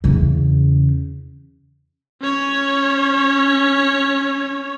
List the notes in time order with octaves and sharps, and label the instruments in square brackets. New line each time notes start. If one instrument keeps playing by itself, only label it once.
[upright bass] E2 C#3
[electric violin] C#4 C#5